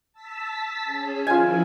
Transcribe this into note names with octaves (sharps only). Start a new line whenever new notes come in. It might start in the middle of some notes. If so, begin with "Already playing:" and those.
A5 E6 B6
C#4 G#4
D#3 F3 E4 F4 G#5